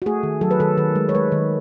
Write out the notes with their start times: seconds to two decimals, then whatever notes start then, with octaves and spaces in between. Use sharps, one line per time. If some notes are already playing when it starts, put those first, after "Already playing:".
0.02 F#4
0.06 A3 G#4
0.23 D#3
0.41 F#3 A4
0.51 B4
0.60 D#3 A4
0.77 D#3 B4
0.96 G#3
1.09 C#5
1.15 G#3 B4
1.32 D#3